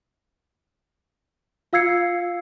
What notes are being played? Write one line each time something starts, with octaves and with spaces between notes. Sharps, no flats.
F4 F5 E6 G#6 C7 C#7